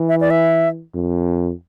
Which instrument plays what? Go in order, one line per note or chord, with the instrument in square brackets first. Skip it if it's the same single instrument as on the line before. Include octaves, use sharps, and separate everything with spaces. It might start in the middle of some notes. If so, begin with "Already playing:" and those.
Already playing: [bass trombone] E3
[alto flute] E5
D5
E5
[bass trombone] F2